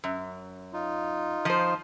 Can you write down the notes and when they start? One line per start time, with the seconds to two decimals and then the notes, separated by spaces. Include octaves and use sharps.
0.04 F#2
0.73 D#4 F4
1.45 F3 C5